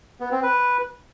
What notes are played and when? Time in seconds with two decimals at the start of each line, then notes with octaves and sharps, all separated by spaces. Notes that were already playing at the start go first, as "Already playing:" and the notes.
0.20 B3
0.32 C4
0.43 B4